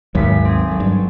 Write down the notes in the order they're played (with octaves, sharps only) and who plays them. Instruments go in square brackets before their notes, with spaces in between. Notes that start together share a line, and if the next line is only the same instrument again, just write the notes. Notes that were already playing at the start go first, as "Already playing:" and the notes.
[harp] G#1 B6 [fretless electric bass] D#2 G#2 F#3
[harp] C4 G#4
F#3 A4
[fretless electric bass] G2